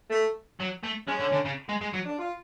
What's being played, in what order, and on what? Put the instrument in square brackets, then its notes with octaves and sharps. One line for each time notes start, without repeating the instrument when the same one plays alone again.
[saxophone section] A3
[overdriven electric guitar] F#3
A3
[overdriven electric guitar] G#3 [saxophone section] C#4
[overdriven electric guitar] D3
D3
C#3
G#3
G#3
F#3
[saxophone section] D4
F4